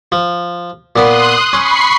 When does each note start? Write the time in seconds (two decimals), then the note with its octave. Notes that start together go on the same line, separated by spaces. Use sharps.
0.12 F3
0.96 A#2 B3 C6 D#6 F#6
1.53 C#4 B5 C#6 C7